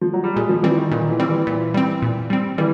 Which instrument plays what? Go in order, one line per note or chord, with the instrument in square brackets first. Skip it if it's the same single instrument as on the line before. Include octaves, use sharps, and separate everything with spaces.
[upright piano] F3
F#3
G3
[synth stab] A#2 [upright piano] G#3
[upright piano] F3
[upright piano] E3 [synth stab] G3 C4
[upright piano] D#3
[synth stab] A#2 [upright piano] D#3
[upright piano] E3
[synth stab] G3 C4
[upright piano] E3
[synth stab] A#2
G3 C4
A#2
G3 C4
[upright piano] E3 [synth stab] G3